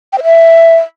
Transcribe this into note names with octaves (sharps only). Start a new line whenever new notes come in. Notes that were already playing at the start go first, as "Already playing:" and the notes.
G5
C5
E5